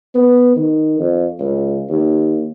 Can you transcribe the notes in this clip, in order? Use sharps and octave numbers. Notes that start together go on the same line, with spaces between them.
B3
D#3
F2
C#2
D#2